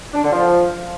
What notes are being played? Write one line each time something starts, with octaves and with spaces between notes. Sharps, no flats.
D4
D3
F3